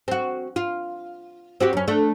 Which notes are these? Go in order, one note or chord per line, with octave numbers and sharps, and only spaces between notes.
C4 F#4
F4
C4 F#4 G4
F#2 C#4
A3 D4